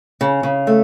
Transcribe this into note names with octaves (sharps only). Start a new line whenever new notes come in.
C#3
C#3
A3